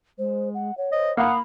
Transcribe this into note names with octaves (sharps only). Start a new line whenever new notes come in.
G#3 C5
F#5
C#5 F#5
C5 D#5
A#3 F5 F#5 B5 D#6